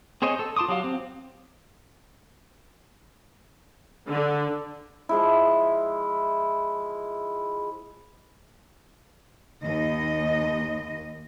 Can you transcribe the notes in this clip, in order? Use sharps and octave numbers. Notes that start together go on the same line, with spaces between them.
C4 G#4 C5 C#5 D#5
A4
F4 A5 C6 D6 D#6
F#3 G4 F5
C4
D3
F3 G#3 E4
D#2 D#5